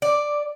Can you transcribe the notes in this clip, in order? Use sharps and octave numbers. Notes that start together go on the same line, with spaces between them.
D5